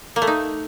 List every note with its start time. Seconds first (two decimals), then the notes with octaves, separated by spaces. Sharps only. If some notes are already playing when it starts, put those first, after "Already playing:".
0.16 A#3
0.22 A3
0.27 D#4